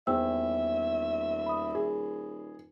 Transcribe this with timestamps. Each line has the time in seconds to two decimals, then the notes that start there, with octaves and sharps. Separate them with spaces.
0.07 D#1 E2 C5 E5 G5 E6
1.46 B5 D#6
1.75 G#4